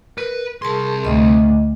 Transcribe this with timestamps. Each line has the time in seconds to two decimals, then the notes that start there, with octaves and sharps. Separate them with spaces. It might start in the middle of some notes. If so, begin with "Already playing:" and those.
0.18 A#4 B4
0.62 C2 G#4 A#4 A5 C6
1.05 D2 D#5